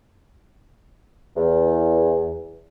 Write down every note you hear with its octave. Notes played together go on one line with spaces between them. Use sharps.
E2